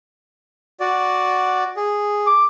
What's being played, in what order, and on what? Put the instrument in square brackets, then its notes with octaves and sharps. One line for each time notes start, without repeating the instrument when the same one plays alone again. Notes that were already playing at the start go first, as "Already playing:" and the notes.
[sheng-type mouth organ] F#4 D5
G#4
[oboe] D6